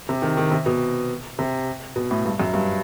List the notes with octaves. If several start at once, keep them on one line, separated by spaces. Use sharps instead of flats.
C3
D#3
D#3
C3
B2
C3
B2
A2
G2
F#2
G2